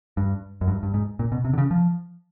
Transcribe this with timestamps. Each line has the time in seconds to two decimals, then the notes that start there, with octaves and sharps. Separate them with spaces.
0.17 G2
0.61 F#2
0.68 G2
0.83 G2
0.94 G#2
1.19 A#2
1.32 B2
1.45 C3
1.53 D3
1.58 C#3
1.71 F3